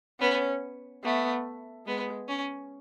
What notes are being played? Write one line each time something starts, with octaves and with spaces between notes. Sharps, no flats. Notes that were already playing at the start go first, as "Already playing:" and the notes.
B3 C#4
A3 B3
G#3 B3
C#4